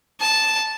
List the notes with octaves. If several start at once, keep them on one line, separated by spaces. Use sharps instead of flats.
A5